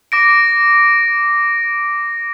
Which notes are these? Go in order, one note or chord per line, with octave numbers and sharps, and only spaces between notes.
D6 A#6 D7